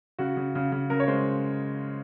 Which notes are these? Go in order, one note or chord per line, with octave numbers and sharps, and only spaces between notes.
C#3 F#4
C#3
C#3
C#3
C#3 A#4
C#5
G#3 C5